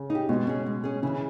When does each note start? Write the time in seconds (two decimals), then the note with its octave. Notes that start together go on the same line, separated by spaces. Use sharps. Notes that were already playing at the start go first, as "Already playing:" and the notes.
Already playing: C#3
0.10 D#4
0.15 G4
0.29 B2 G#3
0.47 C#4 G#4
0.66 G#3
0.84 C#4 G#4
1.03 C#3 E3